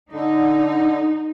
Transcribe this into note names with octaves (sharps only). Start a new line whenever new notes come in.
D3 D#4